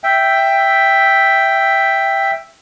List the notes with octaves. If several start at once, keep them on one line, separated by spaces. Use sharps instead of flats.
E5 G5